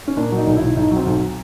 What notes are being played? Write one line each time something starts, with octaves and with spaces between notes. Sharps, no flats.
C#4
A#2 D4
F#3
D#4
B1
E4
B1
B1 D#4
F#3
C4
B1